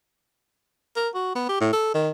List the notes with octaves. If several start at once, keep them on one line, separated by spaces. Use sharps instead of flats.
A#4
F#4
B3
G4
A2
A4
D#3